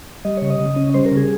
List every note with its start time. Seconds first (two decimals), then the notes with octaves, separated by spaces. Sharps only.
0.25 G3 D#5
0.37 C#3 C#5
0.50 D#5
0.60 C#3
0.76 C#4
0.94 G3 C5
1.06 A#4
1.12 C#3
1.17 G#4